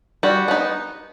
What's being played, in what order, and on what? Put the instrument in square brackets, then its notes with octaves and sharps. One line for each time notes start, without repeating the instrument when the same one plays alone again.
[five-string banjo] G3 F#4
B3 D#4